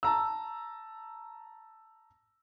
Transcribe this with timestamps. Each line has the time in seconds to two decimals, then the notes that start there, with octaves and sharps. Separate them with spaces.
0.03 A5 A#5 E6